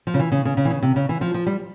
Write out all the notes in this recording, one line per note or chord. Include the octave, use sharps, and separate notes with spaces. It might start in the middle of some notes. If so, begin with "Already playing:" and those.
F3
C#3
E3
C#3
C#3
C#3
E3
C#3
C3
C#3
E3
F3
F3
G3